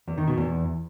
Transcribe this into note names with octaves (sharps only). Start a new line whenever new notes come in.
E2
D#3
B2
E2